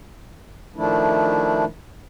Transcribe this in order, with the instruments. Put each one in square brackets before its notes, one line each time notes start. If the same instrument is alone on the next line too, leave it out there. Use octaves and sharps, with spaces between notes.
[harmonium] D#3 F3 A3 D4 E4